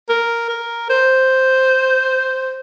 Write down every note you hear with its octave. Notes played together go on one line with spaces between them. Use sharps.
A#4
A#4
C5